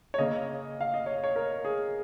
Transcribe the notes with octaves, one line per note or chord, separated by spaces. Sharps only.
C#5
C#3 A#3 D#5
F5
D#5
C#5
C#5
A#4
G#4